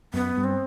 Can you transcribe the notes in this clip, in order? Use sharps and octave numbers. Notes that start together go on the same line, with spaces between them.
F#2 B3
G2
C4